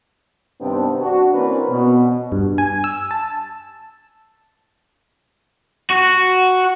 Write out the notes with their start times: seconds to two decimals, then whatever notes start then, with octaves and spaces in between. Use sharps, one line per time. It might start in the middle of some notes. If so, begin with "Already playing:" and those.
0.62 G2 C3 D#3 B3 C4 D4
1.01 D4 F#4
1.33 E3 A#3 C4 C#4 B4 D5
1.69 B2
2.32 G2
2.58 G#5
2.84 E6
3.11 A5
5.90 F#4